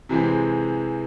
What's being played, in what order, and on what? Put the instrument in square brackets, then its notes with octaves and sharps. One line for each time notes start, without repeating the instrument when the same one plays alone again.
[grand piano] C3 E3 G#3 C4